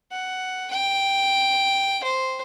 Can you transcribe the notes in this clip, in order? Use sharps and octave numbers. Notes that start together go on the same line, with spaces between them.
F#5
G5
C5